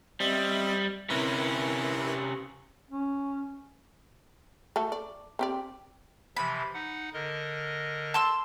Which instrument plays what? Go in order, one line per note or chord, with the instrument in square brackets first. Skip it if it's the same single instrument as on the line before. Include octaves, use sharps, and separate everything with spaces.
[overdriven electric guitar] G3 [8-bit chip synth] C4 D#5 E5
[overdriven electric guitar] C3 C#4 [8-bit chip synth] E4 A#4 B4
[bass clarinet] C#4
[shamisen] A3 F#4 A4
D5
C4 G4 D5
[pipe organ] C3 E3 F3 [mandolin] B5
[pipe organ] D#4 F#5
D3 A#4 D#5
[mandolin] A5 C6 E6